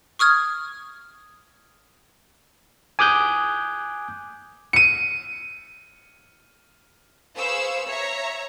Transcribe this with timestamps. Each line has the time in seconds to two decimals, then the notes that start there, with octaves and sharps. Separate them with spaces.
0.19 C#6 D#6 F6 G#6
2.99 G#5 D6 D#6 F#6 G6
4.73 C#7 D#7
7.37 G#4 B4 C5 F5 C#6 E6
7.88 C#5 E5 A#5